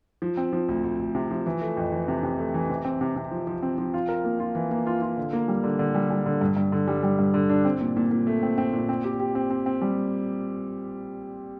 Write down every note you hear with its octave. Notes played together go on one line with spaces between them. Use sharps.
F3
C4
F3
D2
D2
D2
C3
F3
E3
A3
F2
E3
C3
C3
A3
E3
C3
C4
C3
C3
F3
F3
C4
F3
F4
A#4
A#3
F4
E3
A#3
F4
F4
D3
A#3
G3
D3
D3
G3
G3
D3
G2
G2
D3
G3
G3
G2
D3
D4
C4
A#2
A#2
A#2
A3
C4
C4
A#2
C4
G4
G4
C4
C4
C4
G3